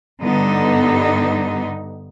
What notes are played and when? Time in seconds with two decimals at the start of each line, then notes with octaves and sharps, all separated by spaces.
0.21 G2 D3 G3 B3 D#4